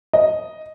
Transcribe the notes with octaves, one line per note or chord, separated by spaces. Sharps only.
D#5